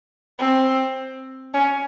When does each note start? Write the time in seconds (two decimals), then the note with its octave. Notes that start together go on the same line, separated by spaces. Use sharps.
0.39 C4
1.54 C#4